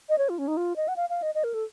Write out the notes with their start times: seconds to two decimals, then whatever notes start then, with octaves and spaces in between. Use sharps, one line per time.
0.09 D#5
0.18 C#5
0.29 F4
0.38 C#4
0.48 D#4
0.57 F4
0.76 D#5
0.88 F#5
0.96 F5
1.10 F5
1.23 D#5
1.35 D#5
1.44 A#4
1.54 A4